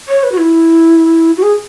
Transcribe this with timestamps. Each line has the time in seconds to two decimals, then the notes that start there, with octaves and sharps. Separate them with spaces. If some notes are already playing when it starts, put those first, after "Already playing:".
0.09 C#5
0.23 B4
0.32 F#4
0.38 E4
1.37 F#4
1.43 G#4